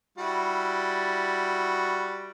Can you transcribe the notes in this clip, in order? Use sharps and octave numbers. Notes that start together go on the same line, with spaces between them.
G3 E4 F#4